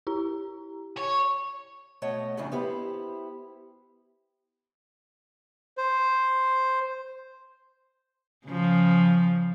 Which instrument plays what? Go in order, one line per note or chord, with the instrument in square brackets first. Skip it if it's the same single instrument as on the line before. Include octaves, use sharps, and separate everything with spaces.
[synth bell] E4 G4 A#5
[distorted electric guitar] C#5
[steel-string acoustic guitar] B2 A3 C#5 D#5 F#5
F2 A#2 C#3 F3 D4 E4
B3 E4 G4 C5
[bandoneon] C5
[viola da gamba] C#3 F3